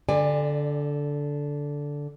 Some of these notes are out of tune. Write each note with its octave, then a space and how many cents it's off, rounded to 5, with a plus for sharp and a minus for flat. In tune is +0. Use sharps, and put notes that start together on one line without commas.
D3 -10 D5 +20 G#5 -35